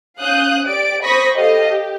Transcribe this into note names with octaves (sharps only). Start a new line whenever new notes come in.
C#4 F5 D#6 F#6 G6
G4 D5 D7
C5 B5 C#6 D#6 A#6 B6
G4 A4 D#5 F5
G4